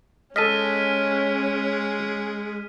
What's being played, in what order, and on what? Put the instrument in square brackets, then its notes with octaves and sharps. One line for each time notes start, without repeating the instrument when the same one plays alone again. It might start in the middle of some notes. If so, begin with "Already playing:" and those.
[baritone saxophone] G#3 [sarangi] C#4 [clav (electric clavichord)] A4 D#5 [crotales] F6 B6 D#7